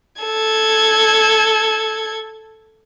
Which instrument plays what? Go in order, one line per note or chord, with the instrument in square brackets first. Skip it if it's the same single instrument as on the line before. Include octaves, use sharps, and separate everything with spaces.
[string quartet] A4 G#6